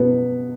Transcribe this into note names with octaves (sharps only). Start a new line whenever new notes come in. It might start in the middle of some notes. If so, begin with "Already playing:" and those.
Already playing: B2 B3